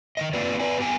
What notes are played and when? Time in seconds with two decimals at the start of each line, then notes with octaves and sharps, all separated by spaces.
0.17 D#3 F3 D#5
0.33 A#3 C4 F4 G4 B4 D5
0.59 B4 D5 G#5
0.79 B3 G4 G5 G#5